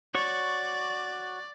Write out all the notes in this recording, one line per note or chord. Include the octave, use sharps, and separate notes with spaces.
F#4 C#5 D5 C#6